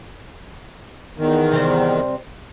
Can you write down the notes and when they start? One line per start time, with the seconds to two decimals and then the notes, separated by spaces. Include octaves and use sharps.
1.18 E2 D#3
1.52 C3 G3 C4